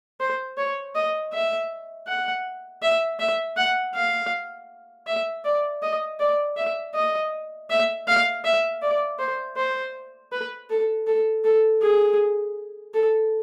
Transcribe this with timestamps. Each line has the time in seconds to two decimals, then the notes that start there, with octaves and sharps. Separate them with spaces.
0.20 C5
0.58 C#5
0.95 D#5
1.33 E5
2.08 F#5
2.83 E5
3.20 E5
3.57 F#5
3.95 F5
5.07 E5
5.45 D5
5.83 D#5
6.20 D5
6.57 E5
6.95 D#5
7.70 E5
8.08 F5
8.45 E5
8.82 D5
9.19 C5
9.57 C5
10.32 B4
10.70 A4
11.07 A4
11.44 A4
11.82 G#4
12.94 A4